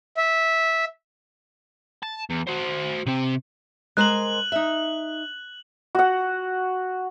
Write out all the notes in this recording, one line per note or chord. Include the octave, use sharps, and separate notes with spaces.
E5
A5
E2
F#4 C5
C3 C4
G#3 A#4 C5 F#6 F#7
D#4 E5
F#4 F#5